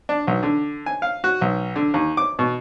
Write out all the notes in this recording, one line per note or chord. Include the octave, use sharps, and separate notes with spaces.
D4
B1
D3
G#5
F5
F#4
B1
D3
D#2
D6
B2